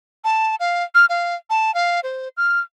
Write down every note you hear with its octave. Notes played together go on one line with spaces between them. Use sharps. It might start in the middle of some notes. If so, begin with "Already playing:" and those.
A5
F5
F6
F5
A5
F5
C5
F6